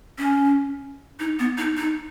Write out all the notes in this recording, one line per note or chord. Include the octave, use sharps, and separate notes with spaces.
C#4
D#4
B3
D#4
D#4